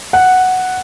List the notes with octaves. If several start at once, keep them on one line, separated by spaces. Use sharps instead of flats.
F#5